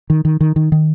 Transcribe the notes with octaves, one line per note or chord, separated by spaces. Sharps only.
D#3
D#3
D#3
D#3
D#3